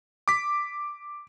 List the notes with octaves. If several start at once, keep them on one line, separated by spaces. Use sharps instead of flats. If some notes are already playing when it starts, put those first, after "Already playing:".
D6 B6